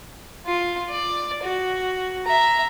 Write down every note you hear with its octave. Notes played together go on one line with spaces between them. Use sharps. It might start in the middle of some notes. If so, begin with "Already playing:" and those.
F4
D5
F#4
E5 A#5